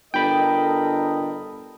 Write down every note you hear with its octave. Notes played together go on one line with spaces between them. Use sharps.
G1 A4 A#4 D#5 G5 B5